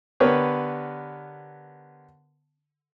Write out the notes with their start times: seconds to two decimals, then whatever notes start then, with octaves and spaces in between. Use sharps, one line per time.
0.20 D3 B3 G4 A#4 B4 C#5